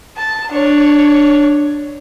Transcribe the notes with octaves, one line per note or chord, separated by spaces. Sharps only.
A5
D4 C#5